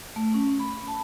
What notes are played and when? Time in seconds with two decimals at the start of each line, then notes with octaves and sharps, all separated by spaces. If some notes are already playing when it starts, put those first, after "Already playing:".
0.16 A3
0.34 C#4
0.60 B5
0.88 A5